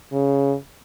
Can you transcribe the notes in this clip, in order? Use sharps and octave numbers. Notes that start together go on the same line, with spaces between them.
C#3